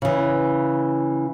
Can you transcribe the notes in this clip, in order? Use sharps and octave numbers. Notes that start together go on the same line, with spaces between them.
C#3 E3